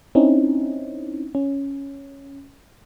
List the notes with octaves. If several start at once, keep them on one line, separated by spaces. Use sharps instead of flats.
C4 C#4 D#4 E4
C#4